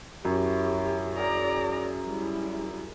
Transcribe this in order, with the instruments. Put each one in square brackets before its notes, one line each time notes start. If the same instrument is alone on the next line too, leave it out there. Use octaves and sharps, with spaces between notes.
[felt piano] F#2 [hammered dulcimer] E4 C#5 [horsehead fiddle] G4
[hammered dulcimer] G#4 A#4 G5 [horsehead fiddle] D5 A#5
[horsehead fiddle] G3 E4